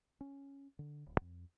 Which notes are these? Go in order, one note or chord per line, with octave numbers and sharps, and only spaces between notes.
C#4
D3
D1
F2